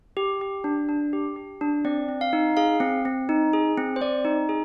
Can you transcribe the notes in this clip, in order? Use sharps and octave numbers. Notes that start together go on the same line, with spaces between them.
G4
G4
D4
D4
G4
G4
D4
C4 D5
C4
F5
D#4
G#4 F5
C4
C4
D#4
G#4
C4
C5
C4 D5
D#4
G#4